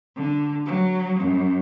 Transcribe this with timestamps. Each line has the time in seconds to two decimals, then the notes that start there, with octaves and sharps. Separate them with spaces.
0.16 D3
0.66 F#3
1.19 F#2